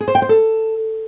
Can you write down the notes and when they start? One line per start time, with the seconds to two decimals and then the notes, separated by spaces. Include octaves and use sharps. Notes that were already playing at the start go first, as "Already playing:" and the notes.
0.01 G#4
0.08 C5
0.15 G5
0.22 C5
0.29 A4